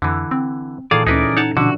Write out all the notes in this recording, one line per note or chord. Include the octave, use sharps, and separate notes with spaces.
F2 D3 E3
C4
A#2 D#3 E3 G#4 A4 D5 F5
D2 C#4 D#4 E4 G#4 A#4 B4 D5
D#4 C#5 F#5 A5
B2 D3 F3 D4 F#4